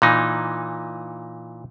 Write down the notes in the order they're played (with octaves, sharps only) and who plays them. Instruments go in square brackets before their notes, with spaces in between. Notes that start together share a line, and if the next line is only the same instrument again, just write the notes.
[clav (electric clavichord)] A#2 E3 D#4